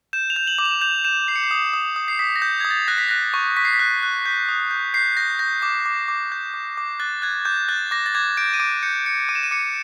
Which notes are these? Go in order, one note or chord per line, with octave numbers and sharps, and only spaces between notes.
G6 E7
F7
G6
F#7
D6
F7
G6 F7
G6 E7
G6 C7
C#7
C7
D#6
D#6
D#6
C7
D#6 B6
A#6
G6
D#6 G#6
A6
F#6 A#6
B6
F#6 A#6
C#6
C#6 B6
C7
B6
F#6
F#6
G6 B6
D#6
G6
G6 C7
G6 A#6
G6 A#6
D6
D6
D6
G6
D6
D6
F#6 A6
F#6 G#6
D6 G6
F#6 A6
D6 A#6
A6
D6 G#6
G6 D7
D#7
D6 D7
G6 C#7
G6 C#7
D6 D#7
E7
D#7
D6 C#7